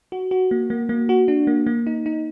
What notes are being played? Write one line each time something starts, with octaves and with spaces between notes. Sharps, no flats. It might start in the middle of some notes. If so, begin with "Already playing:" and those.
F#4
F#4
A#3
A#3
A#3
F#4
D4
A#3
A#3
D#4
D#4